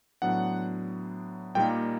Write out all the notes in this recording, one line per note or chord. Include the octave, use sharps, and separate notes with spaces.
A2 F#3 B3 D4 F#5
A#2 G3 A#3 D#4 G5